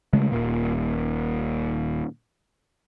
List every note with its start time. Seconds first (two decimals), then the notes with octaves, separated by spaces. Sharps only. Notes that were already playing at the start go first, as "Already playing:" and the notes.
0.13 C#3 G#3 A3
0.32 D#1 A#2